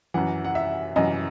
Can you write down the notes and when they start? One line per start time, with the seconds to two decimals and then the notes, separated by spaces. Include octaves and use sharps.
0.14 F#2 E3 F#5
0.45 F#5
0.55 E5
0.96 F#2 E3 D#5